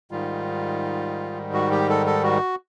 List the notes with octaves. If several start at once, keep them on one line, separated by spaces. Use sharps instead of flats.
G#2 D#3 G3 F4
F#4
G4
A4
A4
F#4